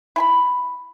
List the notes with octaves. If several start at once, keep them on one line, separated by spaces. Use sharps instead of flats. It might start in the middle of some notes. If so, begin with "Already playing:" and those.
E4 G#5 B5